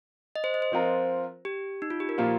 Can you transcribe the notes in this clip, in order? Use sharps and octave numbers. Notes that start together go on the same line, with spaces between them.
D#5
C5
D#5
C5
F3 C4 F4 A#4
G4
D#4
F4
G4
A#4
A#2 F3 A#3 F4 G4